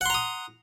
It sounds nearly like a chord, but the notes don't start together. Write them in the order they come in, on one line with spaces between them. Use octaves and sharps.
F#5 C6 A#5 D#6